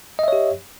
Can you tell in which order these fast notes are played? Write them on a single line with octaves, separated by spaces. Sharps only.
D#5 E5 C#5 G4